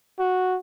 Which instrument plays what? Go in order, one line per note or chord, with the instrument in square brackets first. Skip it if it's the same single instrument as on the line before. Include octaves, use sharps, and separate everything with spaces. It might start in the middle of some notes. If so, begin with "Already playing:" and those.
[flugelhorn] F#4